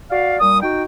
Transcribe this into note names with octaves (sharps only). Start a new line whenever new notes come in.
F#4 D5 F5
A#2 G3 D#6
D#4 F#4 G5